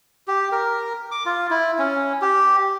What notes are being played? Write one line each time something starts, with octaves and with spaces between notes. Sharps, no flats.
G4
A#4
D6
F4
E4
C#4
G4